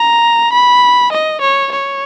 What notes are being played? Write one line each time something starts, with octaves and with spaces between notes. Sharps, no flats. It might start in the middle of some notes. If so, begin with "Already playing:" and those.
Already playing: A#5
B5
D#5
C#5
C#5